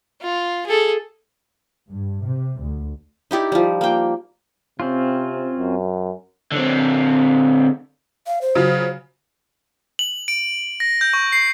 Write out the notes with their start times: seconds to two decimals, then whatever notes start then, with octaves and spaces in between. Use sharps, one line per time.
0.21 F4
0.67 G#4 A4
1.89 G2
2.24 C3
2.59 D2
3.31 D#4 E4 G4 D5
3.52 F3 G3
3.81 A#3 G5
4.80 C3 C4 C#4 F4
5.58 F#2
6.52 D3 C4
8.27 F5
8.41 C5
8.55 C#3 F#3 F4
9.99 F#7
10.28 D7
10.80 A#6
11.01 G6
11.13 C#6
11.32 C7